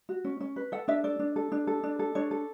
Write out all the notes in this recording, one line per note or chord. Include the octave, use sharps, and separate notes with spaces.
F#4
C#4
C#4
B4
A4 F#5
D4 E5
A4 D5
D4
A4
D4
A4
D4
A4
D4 C#5
A4